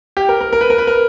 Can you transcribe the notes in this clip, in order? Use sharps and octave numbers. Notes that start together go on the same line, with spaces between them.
G4
A#4
A#4
A#4
B4
A#4
B4
A#4